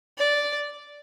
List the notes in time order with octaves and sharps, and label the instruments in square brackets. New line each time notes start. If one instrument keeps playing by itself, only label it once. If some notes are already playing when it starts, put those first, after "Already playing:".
[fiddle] D5